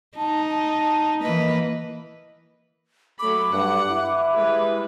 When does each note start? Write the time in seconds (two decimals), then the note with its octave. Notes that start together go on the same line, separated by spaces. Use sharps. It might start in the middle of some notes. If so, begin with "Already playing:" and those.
0.17 D#4 A5
0.50 A5
1.22 E3 A#3 B4 D#5
3.19 F#3 A3 B5 D6
3.52 G2 F#5
3.90 E4
4.33 G3 G#3 B4